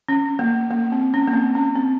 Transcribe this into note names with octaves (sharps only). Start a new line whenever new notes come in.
C#4
A#3
A#3
C4
C#4
A#3
C4
C#4
C4